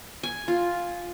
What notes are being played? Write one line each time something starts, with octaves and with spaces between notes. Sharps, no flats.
G#5
F4